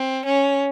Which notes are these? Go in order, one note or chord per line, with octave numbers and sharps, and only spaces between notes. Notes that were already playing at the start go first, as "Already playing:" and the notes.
Already playing: C4
C#4